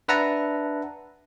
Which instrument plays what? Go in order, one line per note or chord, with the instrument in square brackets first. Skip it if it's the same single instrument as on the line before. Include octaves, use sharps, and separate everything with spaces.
[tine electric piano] D4 B4 E5 F#5 A5 A#5